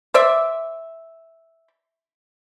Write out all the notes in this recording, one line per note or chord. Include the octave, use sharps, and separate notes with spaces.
C5 D5 E5